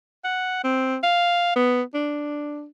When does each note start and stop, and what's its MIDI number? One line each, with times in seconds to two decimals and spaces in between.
0.24 0.60 78
0.64 0.97 60
1.03 1.52 77
1.56 1.82 59
1.94 2.66 62